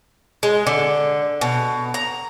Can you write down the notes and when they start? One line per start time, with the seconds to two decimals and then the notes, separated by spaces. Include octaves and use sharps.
0.43 G#3
0.67 D3
1.41 B2
1.94 A#5